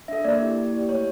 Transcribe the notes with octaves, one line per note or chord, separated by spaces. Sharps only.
D4 A4 E5
A#3 D5
E4 G4
A#3
E4 G4
A3 C#5